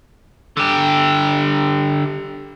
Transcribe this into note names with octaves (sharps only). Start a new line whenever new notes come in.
D3 G4